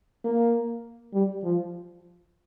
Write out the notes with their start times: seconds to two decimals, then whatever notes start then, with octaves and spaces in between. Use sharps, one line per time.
0.25 A#3
1.14 G3
1.43 F3